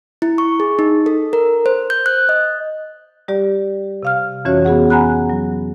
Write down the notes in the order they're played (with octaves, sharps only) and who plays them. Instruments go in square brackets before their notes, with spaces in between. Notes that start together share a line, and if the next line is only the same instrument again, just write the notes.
[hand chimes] E4
C#6
G#4
D#4
A4
A#4
C5
G6
F#6
D#5
[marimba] G3 G4 D5
C3 F5 F6
F2 E3 C#4 F#4 C#5
B3 F#4 G#4 F#5
F#5 G#5 A#5 B5 F#6
F#3